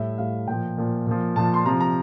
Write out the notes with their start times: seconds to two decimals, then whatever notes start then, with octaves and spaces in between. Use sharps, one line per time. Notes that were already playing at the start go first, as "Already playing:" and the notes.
Already playing: A2 G3 E5
0.18 A2 G3 F5
0.47 A#2 F3 G5
0.78 A#2 F3
1.07 A#2 F3
1.36 A#2 F3 A5
1.54 C6
1.65 C3 F3 A#5
1.80 A#5